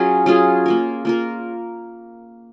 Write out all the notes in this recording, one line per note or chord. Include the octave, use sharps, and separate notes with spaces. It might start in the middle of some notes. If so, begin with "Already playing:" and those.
Already playing: F#3 C#4 F4 G#4
F#3 C#4 F4 G#4
A#3 F4 A#4
A#3 F4 A#4